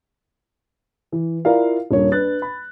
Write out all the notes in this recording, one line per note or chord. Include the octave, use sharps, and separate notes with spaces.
E3
E4 F4 A#4 D5 F5
D#1 G2 A#3 C#5
D4 B4 F#6 A6
B5